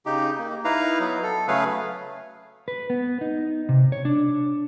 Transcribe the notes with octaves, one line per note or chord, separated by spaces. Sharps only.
C#3 D#4 G4
A#3
D#4 E4 B4 F5 A#5
F#3 B3
A4
C#3 F#3 A3 G#4 B4 F5
B4
B3
D#4
C3
C#5
D4